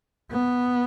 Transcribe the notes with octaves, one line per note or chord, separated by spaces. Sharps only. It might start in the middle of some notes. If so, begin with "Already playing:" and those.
B3